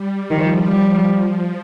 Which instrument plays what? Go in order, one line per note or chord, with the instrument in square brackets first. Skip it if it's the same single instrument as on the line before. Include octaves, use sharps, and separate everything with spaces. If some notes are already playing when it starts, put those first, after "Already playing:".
Already playing: [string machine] G3
[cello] D#3 [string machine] F3
[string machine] F3 [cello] G3